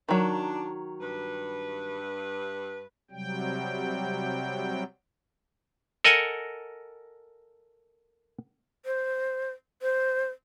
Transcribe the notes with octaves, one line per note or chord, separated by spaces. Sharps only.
D#3 F#3 D4
G2 B4
C3 F#3 G3 G5
A4 A#4 D#5 F#5 G#5
C5
C5